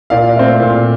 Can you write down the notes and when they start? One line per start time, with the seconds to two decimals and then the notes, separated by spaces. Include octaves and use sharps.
0.10 A#2 D5 F5
0.36 A3 C4
0.60 A#2